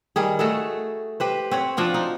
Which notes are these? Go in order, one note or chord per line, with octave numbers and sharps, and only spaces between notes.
D#3 G3 G#4
A3 F#4 G#4 A4
G4 B4 C5
C4 C#5 F#5
F3 D4 F4 F#4
D#4